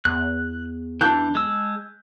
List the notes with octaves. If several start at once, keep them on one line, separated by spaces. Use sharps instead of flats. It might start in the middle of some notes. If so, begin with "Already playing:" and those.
E2 F#6
E3 D4 A5 F#6 G6
G#3 E6